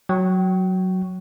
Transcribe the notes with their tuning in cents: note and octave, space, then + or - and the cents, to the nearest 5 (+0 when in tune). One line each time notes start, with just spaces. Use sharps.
F#3 +0 G5 -30 C#6 +0